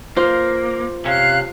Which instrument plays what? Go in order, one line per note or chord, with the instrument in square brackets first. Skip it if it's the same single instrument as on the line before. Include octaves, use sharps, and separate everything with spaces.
[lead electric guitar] A#3 [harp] F4 C5
[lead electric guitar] C3 C#4 [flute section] F5 F#6